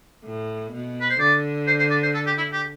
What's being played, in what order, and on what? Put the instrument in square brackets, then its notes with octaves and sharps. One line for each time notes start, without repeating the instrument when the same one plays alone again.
[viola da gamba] A2
B2
[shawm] B4
C5
[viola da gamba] D3 [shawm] D5
[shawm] C5
C5
D5
C5
A4
G4
E4
G4